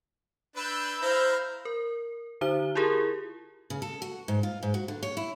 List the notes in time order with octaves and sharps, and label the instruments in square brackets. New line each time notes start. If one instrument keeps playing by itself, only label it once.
[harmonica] D4 B4 [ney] B5 [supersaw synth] E6 G6
[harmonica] E4 F5 A#5 [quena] C5
[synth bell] A#4
D3 D#4 C5 G7
E4 F4 G4 G#4 A#4
[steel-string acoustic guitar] C#3
A4
F#4
G#2
F4
G#2
F#4
D3
C#5
E4